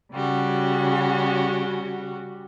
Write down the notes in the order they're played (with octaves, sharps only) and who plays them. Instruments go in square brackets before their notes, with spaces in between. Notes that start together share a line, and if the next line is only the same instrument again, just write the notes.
[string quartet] C#3 G3 F#4